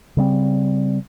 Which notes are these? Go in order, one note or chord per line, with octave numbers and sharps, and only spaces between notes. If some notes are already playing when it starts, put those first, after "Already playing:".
C#3 G3 C4